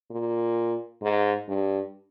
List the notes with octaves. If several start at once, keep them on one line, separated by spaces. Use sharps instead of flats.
A#2
G#2
G2